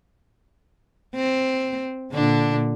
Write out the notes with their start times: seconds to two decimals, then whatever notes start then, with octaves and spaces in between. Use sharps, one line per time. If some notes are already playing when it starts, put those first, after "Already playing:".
1.15 C4
2.13 A#2 D3 D4